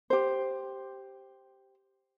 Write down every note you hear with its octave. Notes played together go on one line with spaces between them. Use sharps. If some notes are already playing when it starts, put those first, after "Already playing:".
G4 C5